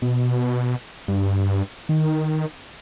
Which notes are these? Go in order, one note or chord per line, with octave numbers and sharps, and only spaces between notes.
B2
G2
D#3